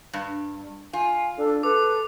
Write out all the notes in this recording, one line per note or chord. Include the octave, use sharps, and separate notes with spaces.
G2
F4 G#5
D4 A4
A4 B4 D6